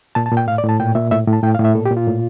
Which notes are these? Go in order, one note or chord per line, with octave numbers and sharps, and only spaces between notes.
A#2 A5
A5
A#2
G5
A2 F5
D5
A2
A5
A#2 G5
A#2 E5
A2 E5
A2
A5
A2 G5
F5
A2
E5
A#2 A4
G4
A#2
F4
A2